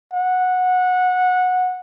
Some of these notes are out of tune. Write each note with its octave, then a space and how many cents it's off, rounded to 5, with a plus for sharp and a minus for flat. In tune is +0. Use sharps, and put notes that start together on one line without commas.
F#5 -15